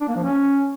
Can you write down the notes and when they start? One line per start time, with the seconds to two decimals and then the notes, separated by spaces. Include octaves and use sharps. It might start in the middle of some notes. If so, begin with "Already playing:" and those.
0.01 D4
0.08 A#3
0.16 F3
0.24 C#4